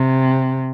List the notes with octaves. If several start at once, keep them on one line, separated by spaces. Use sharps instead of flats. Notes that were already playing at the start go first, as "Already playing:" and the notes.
Already playing: C3